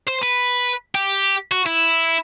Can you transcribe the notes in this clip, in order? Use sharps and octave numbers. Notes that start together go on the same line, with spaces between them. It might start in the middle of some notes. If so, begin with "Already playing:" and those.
C5
B4
G4
F#4
E4